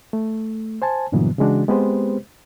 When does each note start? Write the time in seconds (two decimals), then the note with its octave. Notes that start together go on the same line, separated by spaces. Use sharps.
0.13 A3
0.82 C5 G#5 A5
1.12 G2 A#2 D3 E3 F#3 B3
1.38 C#3 E3 G#3 D4 F#4
1.68 G#3 B3 C4 G4 B4 C5